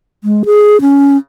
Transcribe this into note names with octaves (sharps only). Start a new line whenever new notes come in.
G#3
G#4
C#4